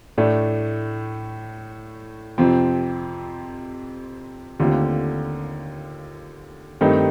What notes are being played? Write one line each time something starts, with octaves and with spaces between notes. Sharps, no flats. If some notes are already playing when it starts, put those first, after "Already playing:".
A2 A3 D4
F2 C3 F3 C4
D#2 D3 A3 C4 F4
G2 D#3 A3 C4 D#4